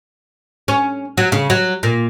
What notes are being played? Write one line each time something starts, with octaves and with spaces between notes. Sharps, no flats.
C#4
F#3
C#3
F#3
A#2